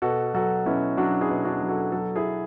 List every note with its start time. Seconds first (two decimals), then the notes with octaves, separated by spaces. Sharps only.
0.02 B2 F#4 A4
0.34 F#3 F#4 A4
0.66 B2 C#4 E4
0.97 F#3 D4 F#4
1.21 E4 G#4
1.28 B2
1.45 D4 F#4
1.61 F#3
1.69 F#4 A4
1.92 F#3 F#4 A4
2.16 E4 G#4